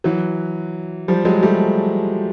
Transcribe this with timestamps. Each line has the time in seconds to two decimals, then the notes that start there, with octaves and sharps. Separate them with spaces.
0.04 E3 F#3
1.08 F3 G3
1.25 F#3 G#3
1.42 G3 A3